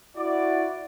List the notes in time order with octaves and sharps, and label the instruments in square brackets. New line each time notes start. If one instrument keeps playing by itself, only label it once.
[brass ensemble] E4 F#4 D5